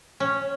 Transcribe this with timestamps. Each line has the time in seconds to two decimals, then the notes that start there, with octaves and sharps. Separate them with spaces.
0.20 C#4